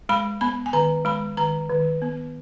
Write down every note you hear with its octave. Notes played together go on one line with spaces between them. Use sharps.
G#3 B5
B3 B5
G#5
D#3 A#5
G#3 B5
D#3 A#5
D#3
B3